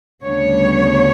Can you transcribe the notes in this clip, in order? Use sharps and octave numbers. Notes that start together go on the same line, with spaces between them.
D2 C#3 G3 B3 D4 C#5